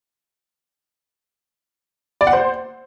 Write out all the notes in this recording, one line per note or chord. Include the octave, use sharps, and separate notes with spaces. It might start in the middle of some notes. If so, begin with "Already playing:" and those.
D5
F#5
C5